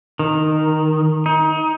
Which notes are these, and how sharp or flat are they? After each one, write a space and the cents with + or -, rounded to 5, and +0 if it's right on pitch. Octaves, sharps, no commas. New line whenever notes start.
D#3 -5
D#4 +25